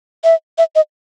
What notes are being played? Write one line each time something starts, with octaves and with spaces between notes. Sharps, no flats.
E5
E5
D#5